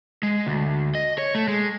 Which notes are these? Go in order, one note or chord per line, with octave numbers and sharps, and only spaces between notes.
G#3
D2
D#5
C#5
A3
G#3